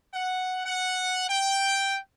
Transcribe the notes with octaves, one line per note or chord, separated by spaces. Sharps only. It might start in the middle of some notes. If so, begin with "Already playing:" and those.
F#5
F#5
G5